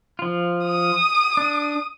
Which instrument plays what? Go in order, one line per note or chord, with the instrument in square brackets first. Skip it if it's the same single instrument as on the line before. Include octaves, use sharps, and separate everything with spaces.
[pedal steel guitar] F3 F4
[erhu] D#6
[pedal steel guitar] D4